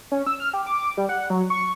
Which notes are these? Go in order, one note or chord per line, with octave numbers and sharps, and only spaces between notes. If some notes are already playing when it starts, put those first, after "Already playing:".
C#4
E6
F6
G4
D6
G3
F#5
F#3
C#6